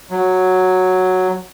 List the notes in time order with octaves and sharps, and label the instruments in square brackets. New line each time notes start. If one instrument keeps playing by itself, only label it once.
[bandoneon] F#3